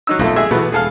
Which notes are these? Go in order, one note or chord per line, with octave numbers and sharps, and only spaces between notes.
F#3 D#4 E6
B1 F2 E3 A3
G#3 G#4 E5
B2 E3 A3 B3
E1 G#4 A4 F5